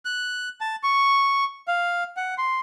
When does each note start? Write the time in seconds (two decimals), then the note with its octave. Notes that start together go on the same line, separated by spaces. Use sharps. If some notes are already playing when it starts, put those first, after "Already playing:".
0.05 F#6
0.61 A5
0.83 C#6
1.68 F5
2.17 F#5
2.38 C6